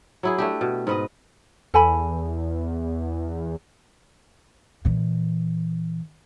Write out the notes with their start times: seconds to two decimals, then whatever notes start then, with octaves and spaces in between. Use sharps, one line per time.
0.23 F#3 E4 G#4
0.38 A3 D4 G4
0.61 B2
0.87 G#2 B4 D#5
1.74 E2 A4 G#5 B5
4.85 A#2 E3